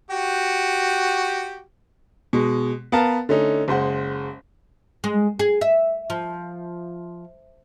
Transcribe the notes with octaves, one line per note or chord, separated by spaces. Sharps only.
F#4 G4
B2 G#3
B3 A#4 F5 A5
D3 A3 C#4 D#4
F#1 G#3 C5 F#5
G#3
G#4
E5
F3